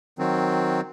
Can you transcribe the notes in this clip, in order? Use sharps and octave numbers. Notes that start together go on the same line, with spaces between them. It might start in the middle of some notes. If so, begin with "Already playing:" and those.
D#3 F#3 C4